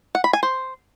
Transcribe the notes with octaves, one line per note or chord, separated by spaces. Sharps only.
F#5
B5
G#5
C5